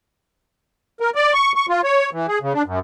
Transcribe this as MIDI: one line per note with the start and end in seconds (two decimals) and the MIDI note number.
1.00 1.10 70
1.15 1.33 74
1.34 1.52 85
1.55 1.66 85
1.69 1.81 65
1.84 2.10 73
2.13 2.27 52
2.27 2.38 68
2.42 2.53 49
2.54 2.62 62
2.66 2.79 42